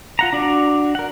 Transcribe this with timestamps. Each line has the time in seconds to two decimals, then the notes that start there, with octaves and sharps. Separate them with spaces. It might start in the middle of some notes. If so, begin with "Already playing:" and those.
0.19 F4 F#5 A#5
0.32 D4 F#4 D5
0.95 A#4 F#5